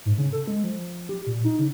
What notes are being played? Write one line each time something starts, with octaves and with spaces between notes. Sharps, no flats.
G#2
C#3
A4
G#3
F3
G4
A#2
D#4
C#3